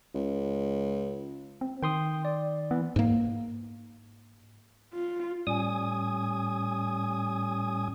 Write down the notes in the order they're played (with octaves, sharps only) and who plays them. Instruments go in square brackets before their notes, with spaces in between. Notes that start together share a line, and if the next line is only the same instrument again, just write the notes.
[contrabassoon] C#2
[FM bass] C4
[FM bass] D#3 [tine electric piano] G5 C6 D#6
[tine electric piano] D5
[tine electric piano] E3 [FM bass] B3
[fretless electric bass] G#2 A#3
[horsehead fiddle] F4
[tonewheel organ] A2 G3 C#4 G#5 D#6